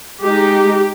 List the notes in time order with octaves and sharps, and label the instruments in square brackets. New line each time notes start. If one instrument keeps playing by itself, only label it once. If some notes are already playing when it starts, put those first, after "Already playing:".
[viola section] G#3 D#4 G4